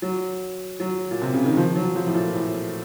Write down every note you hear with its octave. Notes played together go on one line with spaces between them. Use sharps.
F#3
F#3
A#2
C3
C#3
D#3
F3
F#3
F3
A2
A#2
A2